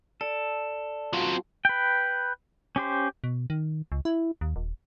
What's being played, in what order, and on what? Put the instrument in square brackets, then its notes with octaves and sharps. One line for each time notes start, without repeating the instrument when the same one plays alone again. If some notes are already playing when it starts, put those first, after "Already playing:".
[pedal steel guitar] A4 [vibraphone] D5
[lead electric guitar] F#3 C4 [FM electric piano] F4 F#4
[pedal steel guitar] B4 G5
C#4 G4 C5
[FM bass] B2
D#3
C#2
E4
D#2
D#1